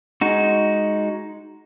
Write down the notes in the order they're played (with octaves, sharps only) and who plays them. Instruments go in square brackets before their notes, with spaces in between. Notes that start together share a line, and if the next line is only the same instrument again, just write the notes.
[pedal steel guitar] G#3 D#4 F#4